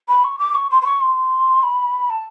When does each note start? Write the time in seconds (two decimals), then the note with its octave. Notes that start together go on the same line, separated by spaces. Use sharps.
0.08 B5
0.24 C#6
0.39 D6
0.54 C#6
0.70 C6
0.81 C6
0.85 C#6
1.01 C6
1.62 B5
2.10 A5